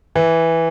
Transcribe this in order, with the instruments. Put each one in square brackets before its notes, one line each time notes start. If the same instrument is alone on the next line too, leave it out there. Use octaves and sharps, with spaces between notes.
[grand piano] E3